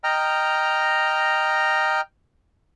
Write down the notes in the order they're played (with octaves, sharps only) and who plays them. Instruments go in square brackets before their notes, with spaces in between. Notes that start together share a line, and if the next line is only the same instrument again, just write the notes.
[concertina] D#5 G5 A#5 F6